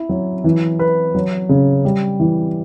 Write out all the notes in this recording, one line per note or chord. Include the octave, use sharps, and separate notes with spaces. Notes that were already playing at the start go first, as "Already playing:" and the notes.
Already playing: E4
F#3
E3
B4
F#3
C#3
G3
E3